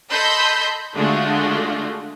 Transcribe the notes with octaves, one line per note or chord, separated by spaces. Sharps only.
A4 D#5 B5 C6 E6 G6
D3 G#3 A3 D4 F4 F#4